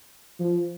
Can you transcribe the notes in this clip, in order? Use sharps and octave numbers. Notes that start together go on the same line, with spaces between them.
F3